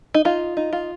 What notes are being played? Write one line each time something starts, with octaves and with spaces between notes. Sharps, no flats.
D#4
D#4 F4
D#4
F4